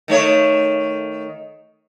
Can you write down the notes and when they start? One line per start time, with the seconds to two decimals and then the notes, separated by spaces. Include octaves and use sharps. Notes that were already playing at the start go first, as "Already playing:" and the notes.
0.08 D#3 A3 C#5